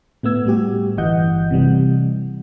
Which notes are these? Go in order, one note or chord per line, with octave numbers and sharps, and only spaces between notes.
A2 A3 B3 E6 G#6
A2 G3 F#4 G4
G1 G2 E3 D#5 F#5 G6
C3 E3 G3